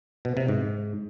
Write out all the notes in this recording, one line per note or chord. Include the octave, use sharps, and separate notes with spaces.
B2
C3
G#2